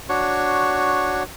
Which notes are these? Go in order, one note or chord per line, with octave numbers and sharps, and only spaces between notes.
D4 F#4 C#5